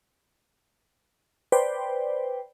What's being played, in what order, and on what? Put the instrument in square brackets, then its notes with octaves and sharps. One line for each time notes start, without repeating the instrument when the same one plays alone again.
[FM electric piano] B4 C5 D5 G5